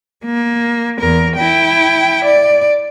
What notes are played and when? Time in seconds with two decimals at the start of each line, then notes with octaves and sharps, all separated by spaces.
0.24 A#3
1.00 E2 A#4
1.37 E4 G5
2.24 D5